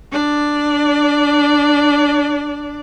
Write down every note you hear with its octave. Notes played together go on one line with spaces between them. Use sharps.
D4 D5